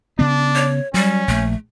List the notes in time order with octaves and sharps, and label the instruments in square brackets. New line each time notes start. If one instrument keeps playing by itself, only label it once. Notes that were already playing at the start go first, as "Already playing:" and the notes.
[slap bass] C#3 B3 [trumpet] D4
[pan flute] C#5
[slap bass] F#3 [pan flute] G3 [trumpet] C#4
[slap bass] A#1 [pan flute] A3